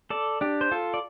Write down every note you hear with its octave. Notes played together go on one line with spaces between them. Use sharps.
A4 D5
D4 G4
C5
F4 A4
D5